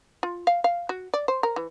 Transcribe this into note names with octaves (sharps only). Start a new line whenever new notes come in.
F4
F5
F5
F#4
D5
C5
A#4
E3